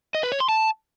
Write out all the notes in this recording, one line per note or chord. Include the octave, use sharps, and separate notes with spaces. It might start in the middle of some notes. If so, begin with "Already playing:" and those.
D#5
B4
C#5
C6
A5